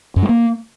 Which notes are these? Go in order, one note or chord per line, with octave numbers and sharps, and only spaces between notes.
F#2
G#3
A#3